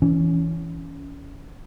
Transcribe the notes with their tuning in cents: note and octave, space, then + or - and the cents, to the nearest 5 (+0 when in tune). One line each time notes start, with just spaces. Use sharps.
E3 +0 C#4 +20